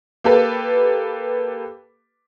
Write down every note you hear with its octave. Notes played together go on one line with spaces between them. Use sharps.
A#3 G4 A4 B4